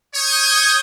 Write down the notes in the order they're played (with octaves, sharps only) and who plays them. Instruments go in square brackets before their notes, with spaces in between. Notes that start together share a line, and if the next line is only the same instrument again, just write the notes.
[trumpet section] C#5 [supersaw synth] D#6 G6 G#6